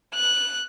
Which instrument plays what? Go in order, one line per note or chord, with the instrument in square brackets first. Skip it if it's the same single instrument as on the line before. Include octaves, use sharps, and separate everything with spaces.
[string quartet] F#6